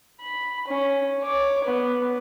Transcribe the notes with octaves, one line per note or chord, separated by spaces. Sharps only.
B5
C#4
C#5 D6
B3